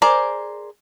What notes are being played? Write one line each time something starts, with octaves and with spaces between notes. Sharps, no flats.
G#4 A#4 C5 D5